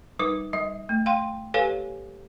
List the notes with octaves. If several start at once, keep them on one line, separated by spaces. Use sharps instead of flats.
G3 D#4 B4 D6
G3 D#5
A3
F5 G5 C6
G4 A4 B4 C#5 F5 G#5